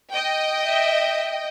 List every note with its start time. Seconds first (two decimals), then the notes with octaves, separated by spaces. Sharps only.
0.12 D#5 G5
0.64 E5